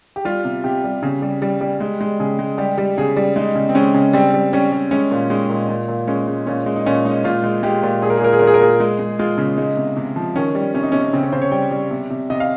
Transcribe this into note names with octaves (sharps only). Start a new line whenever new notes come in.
G4
G3 F4
C3
C3 G4
G3
C#3
G3
G3
G3
G#3
G#3
C#3 G#4
G#3
G3 G4
G3
C#3 G#4
G3
G#3 D#4
C#3
C4
G#3 C#4
C#3
G3 C4
G3
G3 C#4
G3
G#3 C#4
A#2
G#3 D#4
A#2
A#2
A#2
G#3 C#4
G#3
A#2 C#4
G#3
D#4
A#2 C#4
G#3 D#4
A#2 F4
G#3
G#3 G4
A#2
A#2 G#4
A#4
G#4
A#2 A#4
G#4
A#2 A#4
G#4
A#4
A#2 G#4
G#3
G#3
G#3 F4
C#3
G#3 D#4
C3
C3
F3
D#3 C#4
G3
C3 C#4
D#4
C3 C#4
C#3 C4
C#4
C#3 C5
C#5
G3 G5
G3
C3
C3
C3 D#5
F5